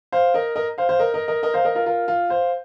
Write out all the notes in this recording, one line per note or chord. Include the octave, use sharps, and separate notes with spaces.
C5 F5
A#4 D#5
A#4 D#5
C5 F5
C5 F5
A#4 D#5
A#4 D#5
A#4 D#5
A#4 D#5
C5 F5
A#4 D#5
F4 A#4
F4 A#4
F4
C5 F5